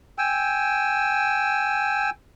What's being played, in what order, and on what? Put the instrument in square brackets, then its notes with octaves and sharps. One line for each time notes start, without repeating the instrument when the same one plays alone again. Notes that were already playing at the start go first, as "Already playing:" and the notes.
[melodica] G5 G#5 E6